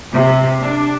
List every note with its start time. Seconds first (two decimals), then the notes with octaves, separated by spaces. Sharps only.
0.12 C3
0.62 D4